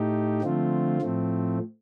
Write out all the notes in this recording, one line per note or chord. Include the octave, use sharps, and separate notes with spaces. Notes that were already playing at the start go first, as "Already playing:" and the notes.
Already playing: A2 A3 D#4 G4
D3 F3 A3 C4 F4
A2 F3 A3 C4